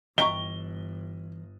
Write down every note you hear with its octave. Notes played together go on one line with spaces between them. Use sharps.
G1 E3 D#5 G5 A#5 C#6 G7